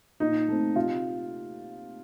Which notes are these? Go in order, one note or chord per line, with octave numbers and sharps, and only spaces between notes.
A#2 D#4
A3 C4
C3 F4